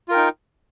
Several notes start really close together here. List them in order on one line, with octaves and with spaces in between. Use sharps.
F4 A#4 G5 D#4